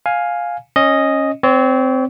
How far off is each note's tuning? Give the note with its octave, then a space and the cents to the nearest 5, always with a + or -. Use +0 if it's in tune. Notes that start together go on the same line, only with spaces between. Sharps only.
F5 +10 G#5 +0
C#4 -15 D#5 +0
C4 -15 C#5 +35